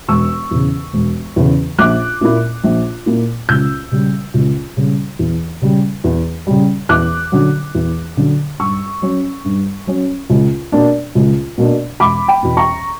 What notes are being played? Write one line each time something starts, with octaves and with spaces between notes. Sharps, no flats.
E1 C#6 E6
E2 C#3
E1
E2 C#3
A#1 D6 F#6
A#2 A#3 E4
A#1
A#2 A#3 E4
C#2 E6 G6
C#3 G3
C#2
C#3 G3
E2
C#3 G3
E2
C#3 G3
E2 D6 F#6
D3 F#3
E2
D3 F#3
G2 C#6 E6
F#3 C#4
G2
F#3 C#4
C#2
B2 A#3 D4
C#2
B2 A#3 D4
E1 B5 D6
G5 B5
E2 B2
A#5 C#6